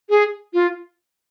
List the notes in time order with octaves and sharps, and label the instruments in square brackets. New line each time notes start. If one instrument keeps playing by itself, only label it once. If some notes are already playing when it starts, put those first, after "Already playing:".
[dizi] G#4
F4